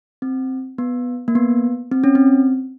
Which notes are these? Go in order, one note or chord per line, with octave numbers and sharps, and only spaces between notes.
C4
B3
A#3
B3
C4
C#4
C4